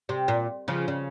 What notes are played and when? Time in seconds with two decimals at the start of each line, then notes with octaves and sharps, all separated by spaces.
0.09 C3
0.28 A#2
0.68 C#3 F3
0.88 C#3